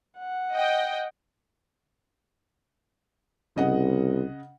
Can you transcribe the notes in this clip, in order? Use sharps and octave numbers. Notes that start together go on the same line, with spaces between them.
F#5
D#5 G5
C2 C#3 D#5 F#5